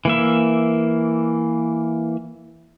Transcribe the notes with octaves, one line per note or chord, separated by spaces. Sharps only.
E3 A#3 E5